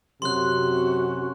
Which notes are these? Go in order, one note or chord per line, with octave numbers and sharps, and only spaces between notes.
F#2 C3 F#4 C6 F#6